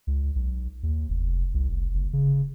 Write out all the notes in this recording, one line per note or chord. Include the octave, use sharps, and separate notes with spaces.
C#2
B1
D#2
F1
C2
F1
F#1
C#3